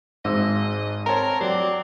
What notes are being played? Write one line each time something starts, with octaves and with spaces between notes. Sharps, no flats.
G#1 G#2 D#5 E6
C4 A#4 C#5 A5 A#5
F#3 C4 D5